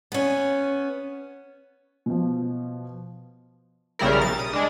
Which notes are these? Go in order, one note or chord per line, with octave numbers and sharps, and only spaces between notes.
B3 C#4
B2 F3
B1 C#3 G3 E4 A#4
A6
D#6
G#3 D4